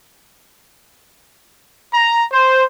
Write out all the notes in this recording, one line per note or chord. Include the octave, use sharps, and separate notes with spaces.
A#5
C5